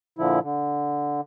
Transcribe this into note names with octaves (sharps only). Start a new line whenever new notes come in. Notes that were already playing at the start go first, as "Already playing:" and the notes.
A#2 D3 F3 E4
D3